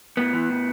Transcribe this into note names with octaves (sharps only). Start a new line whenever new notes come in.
A2 B3
E3
A2